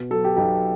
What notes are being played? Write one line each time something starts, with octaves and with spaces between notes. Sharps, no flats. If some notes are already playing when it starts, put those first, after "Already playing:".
Already playing: B2
F#3 A4
G4
B1 G4